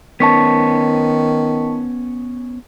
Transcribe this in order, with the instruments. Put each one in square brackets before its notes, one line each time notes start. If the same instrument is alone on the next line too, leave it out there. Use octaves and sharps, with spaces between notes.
[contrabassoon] D#3 [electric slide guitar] B3 C#4 [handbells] A5 C#6 B6